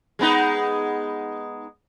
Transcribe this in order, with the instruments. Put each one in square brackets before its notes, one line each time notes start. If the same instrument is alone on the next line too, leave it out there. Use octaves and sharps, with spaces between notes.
[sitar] G#3 B3 D#4